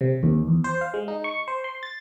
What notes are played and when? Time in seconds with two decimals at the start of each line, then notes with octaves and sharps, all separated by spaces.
0.01 C3
0.23 D#2
0.48 E2
0.64 C5
0.81 F5
0.94 G#3
1.08 D#4
1.24 C#6
1.48 C5
1.64 C6
1.83 A6